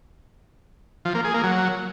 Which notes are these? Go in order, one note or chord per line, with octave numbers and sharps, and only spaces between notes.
F3
A#3
G#4
A#3
F#3